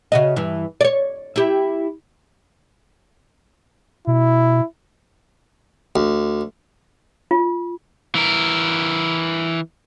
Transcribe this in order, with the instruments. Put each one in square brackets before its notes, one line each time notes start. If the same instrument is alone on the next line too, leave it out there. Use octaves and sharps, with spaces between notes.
[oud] C#3 F#4 D#5
G2 E3
C#5 D5
E4 G4
[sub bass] B2 [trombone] E4
[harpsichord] D2
[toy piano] F4
[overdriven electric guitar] E3 A#4